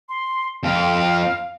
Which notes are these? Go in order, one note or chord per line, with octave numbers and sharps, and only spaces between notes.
C6
F2 C4 F5